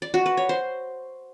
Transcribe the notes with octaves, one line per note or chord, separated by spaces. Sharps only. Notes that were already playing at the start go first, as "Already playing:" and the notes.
D5
F#4
B4
C#5
C5